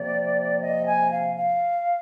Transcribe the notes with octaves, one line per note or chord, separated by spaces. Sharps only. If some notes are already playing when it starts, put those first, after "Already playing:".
Already playing: C3 F3 A#3 D5
D#5
G#5
F5
F5